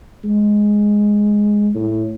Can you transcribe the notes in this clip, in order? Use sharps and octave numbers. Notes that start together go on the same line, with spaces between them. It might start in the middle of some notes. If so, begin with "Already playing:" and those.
G#3
A2